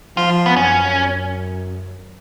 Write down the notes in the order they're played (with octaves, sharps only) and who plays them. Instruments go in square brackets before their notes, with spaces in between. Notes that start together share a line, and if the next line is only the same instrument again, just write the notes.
[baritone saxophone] F3 [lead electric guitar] F4
[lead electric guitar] B3
[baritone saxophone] F#2 [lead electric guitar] C#4